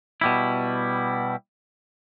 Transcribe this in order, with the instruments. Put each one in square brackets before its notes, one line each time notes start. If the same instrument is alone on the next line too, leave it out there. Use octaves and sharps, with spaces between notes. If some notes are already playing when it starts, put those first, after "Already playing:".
[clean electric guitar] B2 G3 E4